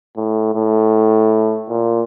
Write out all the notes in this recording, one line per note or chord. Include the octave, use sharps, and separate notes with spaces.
A2
A2
A#2